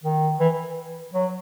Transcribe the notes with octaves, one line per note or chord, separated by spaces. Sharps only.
D#3
E3
F#3